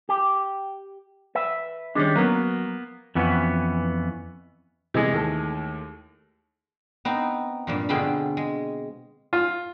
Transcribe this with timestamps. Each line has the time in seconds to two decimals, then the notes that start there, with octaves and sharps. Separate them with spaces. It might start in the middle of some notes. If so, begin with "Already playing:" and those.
0.09 G4
1.35 B4 E5
1.95 D#3 G3 G#3 C#4 D4
2.16 F#3 A#3 B3
3.15 F2 E3 B3 C#4
4.94 C3 E3 G#3 D#5
5.12 D#2 A3 A4
7.05 B3 C4 D#4
7.67 G2 A#2 F3
7.89 B2 D3 C4 F4 G#4 B5
8.37 G#3
9.33 F4